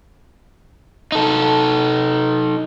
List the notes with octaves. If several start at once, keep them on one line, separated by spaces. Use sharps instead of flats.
D#4 A4